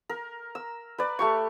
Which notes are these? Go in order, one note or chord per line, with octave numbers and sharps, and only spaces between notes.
A#4
E6
B4 D5
A3 G4 C#6